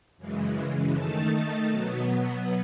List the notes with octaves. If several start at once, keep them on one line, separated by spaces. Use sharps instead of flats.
F#2 C#3 E3 G#3
D#3 A3 D#4 A5
B2 F#3 B3